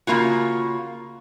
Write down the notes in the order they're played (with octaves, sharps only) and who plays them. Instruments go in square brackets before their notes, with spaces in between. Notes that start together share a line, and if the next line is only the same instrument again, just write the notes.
[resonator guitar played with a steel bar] C#3 F3 A#3 F4 F#4